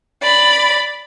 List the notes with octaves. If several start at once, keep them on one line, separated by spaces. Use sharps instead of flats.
D5 B5